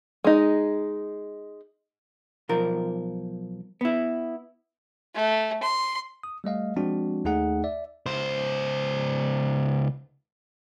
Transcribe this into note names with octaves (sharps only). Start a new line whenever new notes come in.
G#3 D#4
B1 F3 A#4
B3 E4
A3
C6
D#6
G3 A3 D#5 F5
F3 G#3 C4 D4 F#4
D#2 A3 D#4 G#4 F#5
D5 E5
C#2 C5